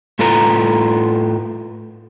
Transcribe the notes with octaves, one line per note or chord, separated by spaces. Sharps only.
A2 F4 A4 B4 A#5